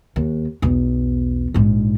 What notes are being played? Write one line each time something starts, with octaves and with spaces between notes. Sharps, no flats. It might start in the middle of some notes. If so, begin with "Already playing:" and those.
D#2
B1 E2
A#1 G#2